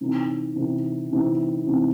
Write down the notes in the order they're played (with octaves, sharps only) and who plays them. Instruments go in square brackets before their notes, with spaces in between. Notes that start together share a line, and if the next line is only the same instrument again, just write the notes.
[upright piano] C3 E3 C4 D#4
C3 E3 C4 D#4
C3 E3 C4 D#4
C3 E3 C4 D#4